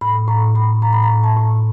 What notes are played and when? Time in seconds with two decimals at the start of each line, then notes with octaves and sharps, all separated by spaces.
0.01 A2 B5
0.28 A2 A#5
0.55 A2 B5
0.82 A2 A#5
0.93 B5
1.03 A#5
1.10 A2
1.24 A5
1.37 A2